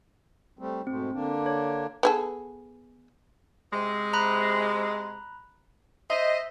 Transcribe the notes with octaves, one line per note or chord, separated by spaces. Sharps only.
G3 A3 C4
G#2 B2 A3 C4
D3 A#3 D4
C#5
B3 G#4 A4
C3 G#3
A#5 B5 F#6
C5 D#5 E5